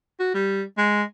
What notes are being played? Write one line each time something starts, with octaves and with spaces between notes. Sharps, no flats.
F#4
G3
G#3